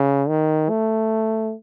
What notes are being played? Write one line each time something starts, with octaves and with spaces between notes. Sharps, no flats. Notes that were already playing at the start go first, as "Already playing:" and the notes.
Already playing: C#3
D#3
A3